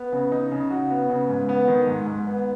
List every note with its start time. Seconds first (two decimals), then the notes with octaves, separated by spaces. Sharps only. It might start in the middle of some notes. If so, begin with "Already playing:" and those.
Already playing: B3
0.12 C#3
0.32 D#4
0.52 C#3
0.70 F#4
0.90 B3
1.09 C#3
1.29 G#2
1.49 B3
1.68 D#3
1.87 G#2
2.06 G#2
2.27 B3